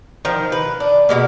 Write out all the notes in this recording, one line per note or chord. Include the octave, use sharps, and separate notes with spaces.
D#3 F3
B4
D4
B2 G#3 A#3